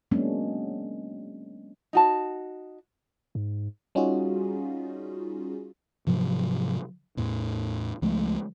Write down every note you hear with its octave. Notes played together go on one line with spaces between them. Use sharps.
F#3 G#3 A#3 B3 C#4 D4
D#4 F#4 A5
G#2
G3 C#4 D#4 F4 F#4 G#4
G#2 C3 F3 F#3
E2 A2
C#2 F3 G#3 A3